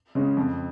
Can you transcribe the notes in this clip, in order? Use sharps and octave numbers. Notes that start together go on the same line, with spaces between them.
C#3 G#3 C#4
F2